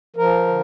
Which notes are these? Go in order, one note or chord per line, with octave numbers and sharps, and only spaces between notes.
F3 A#4
D3